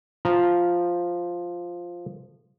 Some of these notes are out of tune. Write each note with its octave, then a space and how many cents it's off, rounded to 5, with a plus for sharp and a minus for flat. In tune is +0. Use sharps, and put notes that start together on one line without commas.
F3 +0 A#5 +0